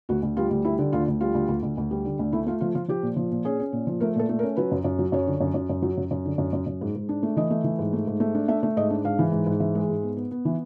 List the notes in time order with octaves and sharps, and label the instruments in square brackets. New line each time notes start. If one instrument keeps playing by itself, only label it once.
[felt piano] D2 F#4
D2
G3 F4
D2
G3 E4
D3
D2 F4
D2
G3 F4
D2
D2
D2
D2
G3
D3
D2
A3 E4
A3 F4
F3 F4
F3 F4
F3 G4
A#2
F3
A#2
C#4 G#4
C#4
A#2
F3
A3 A#4
A#2 A4
A3
A#4
C#4
F#3 B4
F#2
F#2
F#3
F#2 C#5
D3
F#2
F#2
F#2
F#3
F#2
F#2
D3
F#2
F#2
F#2
G#2
G#2
D4
A3
E3 D#5
A3
E3
G#2
A3
G#2
A3
D4
A3 E5
A3
G#2 D#5
D4
G#2 F5
E3
G#2
G#2
E3 E5
G#3
G#2
B3
B3
B3
E3